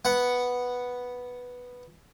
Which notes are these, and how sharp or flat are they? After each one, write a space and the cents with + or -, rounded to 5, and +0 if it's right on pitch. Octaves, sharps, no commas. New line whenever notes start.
B3 +0 F#5 +0